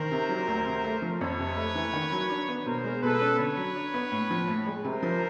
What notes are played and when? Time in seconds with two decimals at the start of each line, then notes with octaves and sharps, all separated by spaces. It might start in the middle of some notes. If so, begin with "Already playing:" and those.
Already playing: D#3 A#4 C5
0.12 C3
0.29 F#3
0.48 D2
0.66 C3
0.84 A3
1.02 F3
1.21 F2 B4 C#5
1.39 C3
1.57 A3
1.75 E3
1.93 D#3
2.12 F#3
2.30 D4
2.48 B3
2.66 B2 A#4 C5
2.84 G#3
3.03 B2 A4 B4
3.21 C#4
3.39 D3 B4 C#5
3.57 F#3
3.76 D4
3.94 B3
4.12 A2
4.31 F3
4.48 A2
4.66 G#3
4.84 C3 A#4 C5
5.03 F3